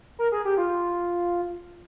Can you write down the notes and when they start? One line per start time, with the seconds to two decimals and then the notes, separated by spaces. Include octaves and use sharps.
0.19 A#4
0.32 G#4
0.45 G4
0.58 F4